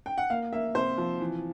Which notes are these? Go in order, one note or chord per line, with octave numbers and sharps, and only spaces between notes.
G5
F#5
A#3 F5
A#3 E5
C3 C5
F3
E3